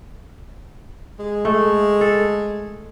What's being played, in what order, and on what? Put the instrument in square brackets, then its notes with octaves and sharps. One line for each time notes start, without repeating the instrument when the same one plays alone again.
[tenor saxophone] G#3
[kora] A3
A4